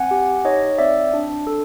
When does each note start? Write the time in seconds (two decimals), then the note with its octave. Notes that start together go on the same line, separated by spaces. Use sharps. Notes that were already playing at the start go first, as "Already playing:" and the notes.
Already playing: C4 F#5 G#5
0.11 G4
0.45 D#4 C#5 D#5
0.78 C4 D5 E5
1.14 D4
1.47 A4